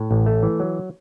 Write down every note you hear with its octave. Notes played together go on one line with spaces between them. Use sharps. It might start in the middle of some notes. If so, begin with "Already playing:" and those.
Already playing: A2
A1
A3
E3
F#3